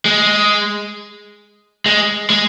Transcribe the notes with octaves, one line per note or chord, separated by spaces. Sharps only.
G#3
G#3
G#3